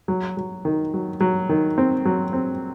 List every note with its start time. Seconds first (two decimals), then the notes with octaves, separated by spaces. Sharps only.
0.08 F#3
0.37 F#3
0.65 D#3
0.94 F#3
1.21 F#3
1.49 D#3
1.78 C4
2.05 F#3
2.33 C4